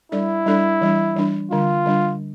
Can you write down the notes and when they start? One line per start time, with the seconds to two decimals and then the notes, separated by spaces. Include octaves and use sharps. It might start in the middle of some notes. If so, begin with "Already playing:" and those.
0.12 G3 D4 E4 A4 D5
0.46 G3 D4 A4 D5
0.81 E3 G3 D4
1.16 E3 G3 D4
1.51 D3 G3 D4 F4
1.86 D3 G3 D4